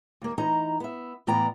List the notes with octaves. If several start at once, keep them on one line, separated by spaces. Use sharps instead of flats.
D#2 A#3
E3 D#4 D#5 A#5
B3 E5
A2 E3 B3 D5 G5 A#5